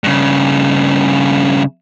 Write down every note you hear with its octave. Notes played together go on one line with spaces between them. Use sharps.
G2 C#3